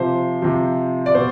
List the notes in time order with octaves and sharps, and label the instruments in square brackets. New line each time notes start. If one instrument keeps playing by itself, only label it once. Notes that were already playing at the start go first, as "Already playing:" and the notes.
Already playing: [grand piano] C3 F3 C5
C3 F3
D5
B2 C5